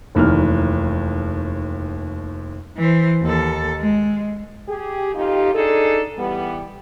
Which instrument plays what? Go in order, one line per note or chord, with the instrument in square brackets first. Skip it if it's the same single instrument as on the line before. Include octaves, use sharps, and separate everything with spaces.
[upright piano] F1 D#2 E3 F6
[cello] E3 C5
D#2 A4
G#3
[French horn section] G4 G#4
F2 D#4 F4 G4
D4 D#4 G#4 A4
E3 G3 B3